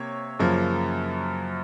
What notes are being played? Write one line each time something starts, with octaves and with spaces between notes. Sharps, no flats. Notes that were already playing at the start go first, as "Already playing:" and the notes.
Already playing: C3 A#3 C#5
F#2 C#3 F3 A#3